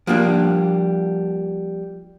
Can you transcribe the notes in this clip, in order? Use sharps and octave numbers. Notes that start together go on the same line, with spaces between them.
F3 G3 A#3 D4